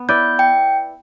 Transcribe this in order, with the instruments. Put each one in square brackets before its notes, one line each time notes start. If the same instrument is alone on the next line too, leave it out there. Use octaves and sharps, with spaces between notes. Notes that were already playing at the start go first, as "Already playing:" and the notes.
Already playing: [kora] B3
[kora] E4 B4 D5 [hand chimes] G6
[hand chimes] G5